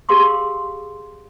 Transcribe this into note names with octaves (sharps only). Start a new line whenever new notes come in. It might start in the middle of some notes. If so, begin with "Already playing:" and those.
G4 G#4 A#4 F5 C6 D6